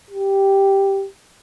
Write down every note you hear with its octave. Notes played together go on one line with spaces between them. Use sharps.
G4